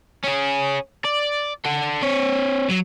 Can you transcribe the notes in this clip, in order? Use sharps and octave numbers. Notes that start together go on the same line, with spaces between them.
C#4 G#4
D5
A4 F#5
C4 C#5
F#3